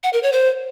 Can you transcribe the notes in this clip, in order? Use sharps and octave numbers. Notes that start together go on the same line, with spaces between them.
F#5
A#4
C#5
C5